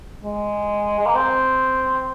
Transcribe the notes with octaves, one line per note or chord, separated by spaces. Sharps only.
G#3
G#3
A#3
C4